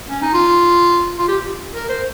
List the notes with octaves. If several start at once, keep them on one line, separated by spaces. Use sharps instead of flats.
C#4
D#4
F4
F4
G4
A#4
C5